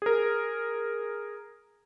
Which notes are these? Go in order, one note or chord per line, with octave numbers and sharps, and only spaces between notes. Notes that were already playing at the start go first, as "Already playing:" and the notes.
G#4 A#4